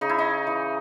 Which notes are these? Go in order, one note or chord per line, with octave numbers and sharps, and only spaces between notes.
C#3 D#4
E4
D#4
E3